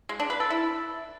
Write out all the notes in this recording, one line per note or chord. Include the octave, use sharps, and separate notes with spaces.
G#3
D4
B4
A4
E4